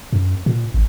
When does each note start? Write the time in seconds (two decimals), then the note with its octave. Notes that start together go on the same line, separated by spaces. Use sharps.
0.13 F#2
0.46 A#2
0.74 G#1